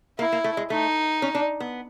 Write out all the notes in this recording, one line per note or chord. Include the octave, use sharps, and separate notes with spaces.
A#3 E4
A#3
A3
G#3
A3 D#4
C#4
D4
B3